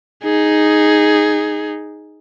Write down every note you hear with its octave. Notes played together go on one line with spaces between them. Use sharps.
D#4 G#4